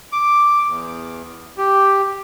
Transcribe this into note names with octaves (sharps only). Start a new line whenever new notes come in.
D6
E2
G4